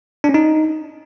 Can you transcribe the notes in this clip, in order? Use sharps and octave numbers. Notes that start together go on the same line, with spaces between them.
D4
C#4
D#4